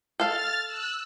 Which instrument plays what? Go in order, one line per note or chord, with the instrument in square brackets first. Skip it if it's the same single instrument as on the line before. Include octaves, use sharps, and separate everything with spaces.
[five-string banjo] A4 F5 [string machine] F6 A6
[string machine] E6 F#6